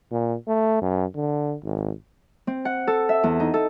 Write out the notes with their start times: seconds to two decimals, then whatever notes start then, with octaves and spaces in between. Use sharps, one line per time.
0.11 A#2
0.48 A3
0.82 F#2
1.15 D3
1.65 G#1
2.47 C4
2.65 F#5
2.87 A4
3.09 E5
3.24 E2
3.40 D#4
3.54 A4